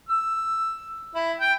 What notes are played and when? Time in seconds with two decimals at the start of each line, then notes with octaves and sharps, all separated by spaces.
0.09 E6
1.15 E4
1.40 G5